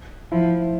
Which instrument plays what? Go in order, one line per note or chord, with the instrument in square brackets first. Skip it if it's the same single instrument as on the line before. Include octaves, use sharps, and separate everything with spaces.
[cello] F3 [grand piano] E4